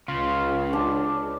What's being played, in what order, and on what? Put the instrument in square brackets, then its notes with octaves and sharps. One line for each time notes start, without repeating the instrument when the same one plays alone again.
[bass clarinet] C#2 [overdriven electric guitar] C#3 [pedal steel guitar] F4
[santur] D4 A5